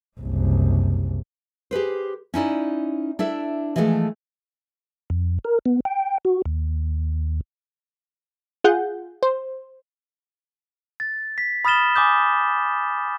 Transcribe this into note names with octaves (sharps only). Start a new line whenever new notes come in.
F#1 C2
G4 G#4 B4 C5
C#4 D#4 E4 D5
D4 E4 A4 E5
E3 F3 G#3 A3 A4
F2
A#4
B3
G5
F#4
D#2
F4 G#4 F#5 G6
C5
A6
B6
B5 D#6 F6 A6 E7 G7
G#5 D6 D#6 G6